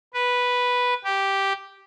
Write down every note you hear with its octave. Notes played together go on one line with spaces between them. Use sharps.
B4
G4